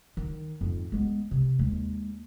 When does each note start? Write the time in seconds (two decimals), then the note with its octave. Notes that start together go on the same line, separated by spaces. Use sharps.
0.17 D#3
0.61 F2 G#2
0.92 G#3 B3
1.31 C3
1.59 D#2 G#3